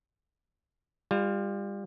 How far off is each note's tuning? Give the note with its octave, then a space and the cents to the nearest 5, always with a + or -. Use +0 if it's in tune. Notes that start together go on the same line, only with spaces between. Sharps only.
G3 +30 F4 +0